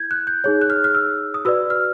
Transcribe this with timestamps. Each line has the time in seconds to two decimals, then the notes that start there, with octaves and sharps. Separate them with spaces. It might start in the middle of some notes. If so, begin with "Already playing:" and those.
Already playing: E4 G6 G#6
0.11 F#6
0.27 G6
0.44 D#4 G#4 C#5 G6
0.61 F#6
0.70 F6
0.84 F6
0.95 E6
1.34 D#6
1.45 F#4 B4 D5 E6
1.70 F6